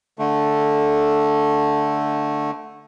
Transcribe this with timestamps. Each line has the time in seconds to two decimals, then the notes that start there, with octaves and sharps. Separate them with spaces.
0.19 D3 A3